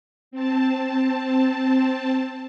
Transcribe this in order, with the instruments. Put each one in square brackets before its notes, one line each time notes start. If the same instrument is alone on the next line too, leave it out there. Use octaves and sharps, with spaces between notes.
[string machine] C4 A5